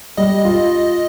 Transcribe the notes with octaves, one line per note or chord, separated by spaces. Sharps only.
G3 D#5
F4